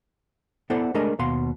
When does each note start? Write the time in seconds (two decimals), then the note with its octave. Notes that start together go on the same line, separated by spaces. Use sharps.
0.70 B3 E4 A4 C5 D5 F#5
0.94 G#3 A3 D4 G#4 A#4 D#5
1.19 D#2 B2 F5 F#5 C6